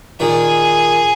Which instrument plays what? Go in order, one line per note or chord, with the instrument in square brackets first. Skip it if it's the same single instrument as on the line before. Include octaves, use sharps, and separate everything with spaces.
[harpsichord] A#2 D#3 [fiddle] G#4